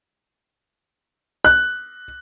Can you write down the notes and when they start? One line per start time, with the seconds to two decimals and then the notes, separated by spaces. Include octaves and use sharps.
1.45 F#6